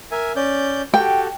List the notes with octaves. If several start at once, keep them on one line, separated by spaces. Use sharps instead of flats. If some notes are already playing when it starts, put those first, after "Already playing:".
A#4 E5 G#5
C#4 D5 G6
F#4 G4 A4 G5